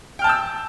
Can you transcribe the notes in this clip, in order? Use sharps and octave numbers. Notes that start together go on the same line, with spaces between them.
G5 A5 E6 F6 G6